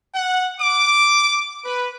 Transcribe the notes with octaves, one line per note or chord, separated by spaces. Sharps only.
F#5
D6
B4